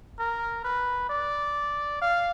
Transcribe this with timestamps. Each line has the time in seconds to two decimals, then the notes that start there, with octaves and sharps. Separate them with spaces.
0.19 A#4
0.65 B4
1.10 D5
2.02 F5